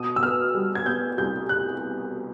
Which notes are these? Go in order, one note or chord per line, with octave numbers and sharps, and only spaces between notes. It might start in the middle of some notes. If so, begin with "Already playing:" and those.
Already playing: B2 D#6
E6
B3 F6
G3
G#6
B3 G6
C2 G6
F#6